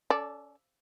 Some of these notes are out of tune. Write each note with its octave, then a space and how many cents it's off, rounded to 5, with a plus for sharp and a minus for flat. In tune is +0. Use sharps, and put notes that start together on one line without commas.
C#4 +25 A4 +0 D5 +0